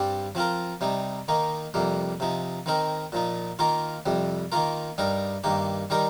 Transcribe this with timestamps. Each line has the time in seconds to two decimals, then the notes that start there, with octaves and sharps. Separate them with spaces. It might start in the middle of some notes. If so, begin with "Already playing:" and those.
Already playing: G2 G3 C4 G4
0.35 F3 C4 F4 A#4
0.81 C3 G3 D#4
1.28 D#3 A#3 D#4
1.74 F2 C3 G3 A#3
2.20 C3 F3 D#4
2.66 D#3 C4 D#4 A#4
3.12 A#2 F3 D#4
3.59 D#3 A#3 F4 A#4
4.06 F2 C3 G3
4.52 D#3 A#3 F4 A#4
4.98 G2 G3 D#4 A#4
5.44 G2 D#3 A#3 G4
5.90 D#3 G3 D#4 G4 A#4